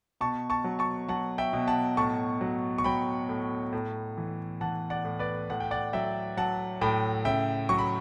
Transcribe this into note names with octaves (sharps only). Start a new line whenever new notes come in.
B2 A5 C#6
A5 C#6
F#3
A5 C#6
F#3 F#5 A5
E5 G5
B2
F#5 A5
A2 A5 C#6
F#3
C#6
F#3 G5 B5
A2
A2
E3
E3 F#5 A5
D5 F#5
A2
B4 D5
A2 F#5
G5
D5 F#5
F#3 E5 G5
F#3 F#5 A5
A2 G5 B5
C#3 E5 G5
F#3 C#6
B5